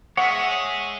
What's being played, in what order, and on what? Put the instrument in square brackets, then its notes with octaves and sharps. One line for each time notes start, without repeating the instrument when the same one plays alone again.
[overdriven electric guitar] G#3 G#4 [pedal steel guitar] C#5 E5 [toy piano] F#5